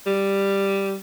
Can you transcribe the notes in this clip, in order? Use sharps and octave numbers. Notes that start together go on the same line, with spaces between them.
G3